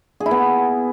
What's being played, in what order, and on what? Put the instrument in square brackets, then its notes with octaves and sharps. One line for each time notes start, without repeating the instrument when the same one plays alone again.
[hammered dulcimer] G#4
E4
B3